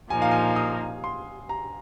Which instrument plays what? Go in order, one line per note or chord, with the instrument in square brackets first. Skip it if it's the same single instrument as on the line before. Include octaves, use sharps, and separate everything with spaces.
[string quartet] A#2 F3 A#3 D#4 [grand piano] G#5
[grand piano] F5
G#5
D#6
C6
A#5